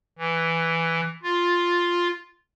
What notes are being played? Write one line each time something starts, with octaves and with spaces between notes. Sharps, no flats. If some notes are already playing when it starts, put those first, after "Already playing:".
E3
F4